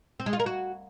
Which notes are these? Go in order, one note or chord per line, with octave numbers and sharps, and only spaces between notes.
C4
G#3
F4
A#4
F#4